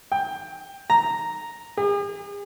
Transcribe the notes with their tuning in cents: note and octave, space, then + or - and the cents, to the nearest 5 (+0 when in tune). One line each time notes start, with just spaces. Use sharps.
G5 +15
A#5 -5
G#4 -45